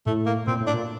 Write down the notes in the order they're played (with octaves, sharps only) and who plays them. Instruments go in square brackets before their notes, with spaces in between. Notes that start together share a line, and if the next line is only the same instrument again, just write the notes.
[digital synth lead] A2 [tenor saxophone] A3
[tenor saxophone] A#3
[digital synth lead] A#2 [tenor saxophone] C4
[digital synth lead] A2
[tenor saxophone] D4
[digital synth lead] A#2